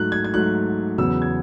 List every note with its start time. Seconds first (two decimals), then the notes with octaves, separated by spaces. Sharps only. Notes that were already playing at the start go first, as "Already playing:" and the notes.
Already playing: G#2 F#3 A3 F#6
0.12 G#6
0.24 G#6
0.34 G#2 F#3 A3 F#6
0.98 E2 C#3 F#3 B3 E6
1.22 G#6